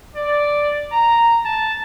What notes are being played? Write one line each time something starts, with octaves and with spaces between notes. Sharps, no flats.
D5
A#5
A5